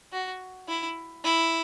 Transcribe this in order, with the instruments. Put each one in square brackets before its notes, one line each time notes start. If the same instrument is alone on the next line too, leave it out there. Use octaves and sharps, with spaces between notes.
[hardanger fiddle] F#4
E4
E4